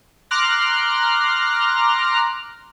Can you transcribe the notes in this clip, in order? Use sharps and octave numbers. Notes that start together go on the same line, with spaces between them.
A#5 C6 D6 F6 F#6 A#6